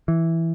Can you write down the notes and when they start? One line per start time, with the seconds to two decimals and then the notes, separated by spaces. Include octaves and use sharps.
0.08 E3